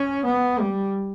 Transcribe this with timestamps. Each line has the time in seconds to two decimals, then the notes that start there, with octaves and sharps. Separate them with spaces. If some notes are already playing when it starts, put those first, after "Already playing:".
Already playing: C#4
0.25 B3
0.59 G3